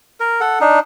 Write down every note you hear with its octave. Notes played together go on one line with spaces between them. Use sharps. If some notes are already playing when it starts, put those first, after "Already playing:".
A#4
A4 F#5
D4 D#4